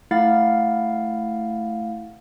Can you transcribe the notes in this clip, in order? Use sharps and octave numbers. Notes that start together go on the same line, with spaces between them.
A3 E4 F5 F#5 A6